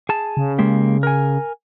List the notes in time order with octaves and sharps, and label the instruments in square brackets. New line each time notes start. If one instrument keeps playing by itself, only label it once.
[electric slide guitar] G#4 A5
[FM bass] C#3
[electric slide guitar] G#3 A#3 G4
A#4 G#5